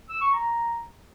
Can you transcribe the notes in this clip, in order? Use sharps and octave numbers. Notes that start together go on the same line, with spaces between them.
E6
C#6
A#5